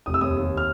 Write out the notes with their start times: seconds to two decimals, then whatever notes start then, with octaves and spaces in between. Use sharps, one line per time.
0.06 F1 D#6
0.14 E6
0.21 D#2 D#6
0.37 D#2
0.57 F6